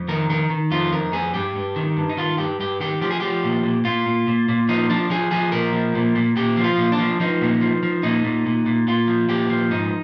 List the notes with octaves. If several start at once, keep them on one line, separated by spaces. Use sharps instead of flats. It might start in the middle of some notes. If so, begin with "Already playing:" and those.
Already playing: F2
D#3 A#4
D#3 A#4
D#3
F2 F4
F2 A#4
F2 G#4
G2 G4
G2
D#3
G2
D#4
D#3 F4
G2 G4
G2 G4
D#3 G4
F3 G4
G#4
F3 G4
A#2
A#2
A#2 F4
A#2
A#2
A#2
F3 D#4
F3 D4
F3 G#4
F3 G#4
A#2 A#4
F3
A#2
A#2
A#2 G4
F3
F4
A#2
D4
F3
F3 D#4
A#2
F3
F3
A#2 D#4
A#2
A#2
A#2
A#2 F4
F3
A#2 G4
F3
G#2 D#4